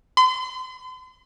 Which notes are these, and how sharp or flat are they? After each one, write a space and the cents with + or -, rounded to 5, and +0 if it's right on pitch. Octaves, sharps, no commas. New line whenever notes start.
C6 -40